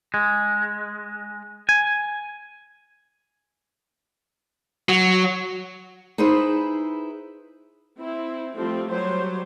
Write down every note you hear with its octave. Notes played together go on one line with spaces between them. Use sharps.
G#3
G#5
F#3
D#4 E4 G#4 B4 C5 E5
C4 E4
F3 G3 A3 C4
F#3 G3 C5